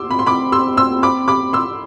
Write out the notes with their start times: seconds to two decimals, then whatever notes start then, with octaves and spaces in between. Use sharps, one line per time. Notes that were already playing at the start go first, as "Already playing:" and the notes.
Already playing: C6 D6 E6
0.08 C4 B5
0.19 C6
0.26 C4 B5 D6
0.52 C6 E6
0.77 C6 E6
1.03 B5 D6
1.28 B5 D6
1.53 C6 E6